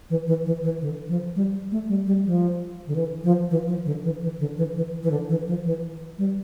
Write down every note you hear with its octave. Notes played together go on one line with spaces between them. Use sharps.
E3
E3
E3
E3
D3
F3
G3
A3
G3
G3
F3
D3
E3
F3
E3
F3
D3
E3
E3
D3
E3
E3
E3
D3
E3
F3
E3
G3